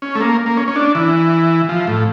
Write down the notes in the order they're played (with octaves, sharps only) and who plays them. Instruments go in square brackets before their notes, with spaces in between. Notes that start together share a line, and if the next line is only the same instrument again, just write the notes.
[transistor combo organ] C#4
A3
A#3
A#3
C#4
C#4
D4
E3
F3
A2